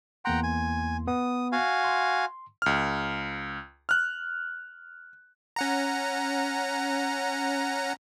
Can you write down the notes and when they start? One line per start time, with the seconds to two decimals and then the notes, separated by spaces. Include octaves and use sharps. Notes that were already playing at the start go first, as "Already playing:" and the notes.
0.25 E2 A#3 F#5 G5 A#5 C6
0.43 G#5
1.07 B3 D#6
1.52 F#4 F5 G#5
1.84 C6
2.62 C#2 F6
3.89 F6 F#6
5.56 C#4 F#5 A#5